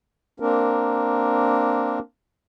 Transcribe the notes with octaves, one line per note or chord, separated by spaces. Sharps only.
A#3 C4 D4 A#4